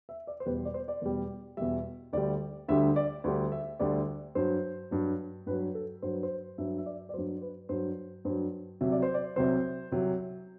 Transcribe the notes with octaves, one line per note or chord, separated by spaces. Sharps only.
E5
D5
C5
E2 B2 G3 B4
D5
C5
D5
E2 B2 G3
E2 B2 G3 E5
D2 D3 G3 D5
D2 D3 G3 E5
D5
D2 D3 G3
E5
D2 D3 G3 D5
G2 F#3 C5
G2 F#3
G2 F#3 B4
A4
G2 F#3 C5
B4
C5
G2 F#3 E5
E5
D5
D5
G2 F#3 C5
B4
G2 F#3 C5
G2 F#3 C5
C2 C3 F#3 E5
D5
C5
D5
C2 C3 F#3 C5
C2 C3 F#3